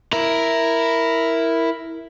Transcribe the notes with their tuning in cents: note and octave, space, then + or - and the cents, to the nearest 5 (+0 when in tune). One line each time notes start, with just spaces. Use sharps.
E4 +0 A#4 +0